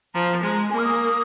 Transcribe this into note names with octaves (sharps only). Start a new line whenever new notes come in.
F3 A#5
G#3
A#3 G#5
F6
D#6